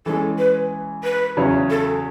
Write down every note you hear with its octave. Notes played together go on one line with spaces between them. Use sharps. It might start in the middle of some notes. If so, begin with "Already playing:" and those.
E3 G#3 C#4 G#4 A4
B4
B4
E2 C#3 F#3 C#4 E4
A4